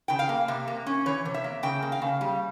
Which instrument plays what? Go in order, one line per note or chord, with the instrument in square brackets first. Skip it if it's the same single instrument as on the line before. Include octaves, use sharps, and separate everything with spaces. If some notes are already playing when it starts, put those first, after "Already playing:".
[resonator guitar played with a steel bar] C#3 G5
F5
A#3
C3 E5
A#3
C#4
E3 C#5
C3
E5
A#3
C#3 G5
A#3
F5
C#3
G3